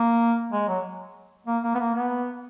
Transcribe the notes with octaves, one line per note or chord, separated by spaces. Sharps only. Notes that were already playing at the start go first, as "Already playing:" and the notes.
Already playing: A#3
G#3
F#3
A#3
A#3
B3
A#3
B3